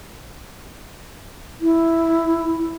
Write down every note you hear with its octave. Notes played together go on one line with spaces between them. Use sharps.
E4